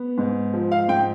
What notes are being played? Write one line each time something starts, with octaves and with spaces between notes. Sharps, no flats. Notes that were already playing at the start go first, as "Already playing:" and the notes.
Already playing: B3
G#2
F3
F5
G#2 G5